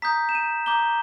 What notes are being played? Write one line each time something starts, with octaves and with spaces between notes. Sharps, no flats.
A#5 D#6 G6 B6
E7
D#7
A#5 D6 G6 G7